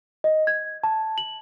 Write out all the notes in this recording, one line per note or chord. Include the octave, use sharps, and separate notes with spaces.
D#5
G#6
A5
F#7